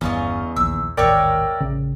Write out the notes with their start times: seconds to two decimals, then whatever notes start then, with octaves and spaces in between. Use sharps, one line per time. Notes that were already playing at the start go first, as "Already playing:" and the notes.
0.01 G1 E2 G2 C#4 F4 D#5
0.56 A#1 D#2 E3 E6
0.97 A1 D#2 G#2 A#4 C#5 D5 E5 G5
1.61 A1 C#3